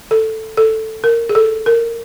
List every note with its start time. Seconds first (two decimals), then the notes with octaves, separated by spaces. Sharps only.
0.11 A4
0.57 A4
1.04 A#4
1.29 G#4
1.35 A4
1.66 A#4